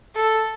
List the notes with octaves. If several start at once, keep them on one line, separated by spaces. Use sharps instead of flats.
A4